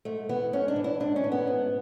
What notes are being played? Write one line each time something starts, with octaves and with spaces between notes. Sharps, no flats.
G#2 A3
E3 B3
G#2 C#4
D4
E3
E4
G#2 D4
C#4
E3
B3
G#2